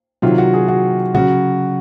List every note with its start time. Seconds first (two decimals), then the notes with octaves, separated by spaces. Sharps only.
0.22 C3 D#3 F#3 F4
0.38 F#4
0.54 G#4
0.68 F#4
1.14 C#3 F#3 F#4